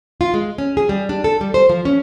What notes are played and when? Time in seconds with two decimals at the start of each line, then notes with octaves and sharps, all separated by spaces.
0.21 F4
0.34 G#3
0.58 C#4
0.77 G#4
0.89 G3
1.09 D4
1.24 A4
1.41 G3
1.54 C5
1.69 F3
1.85 C#4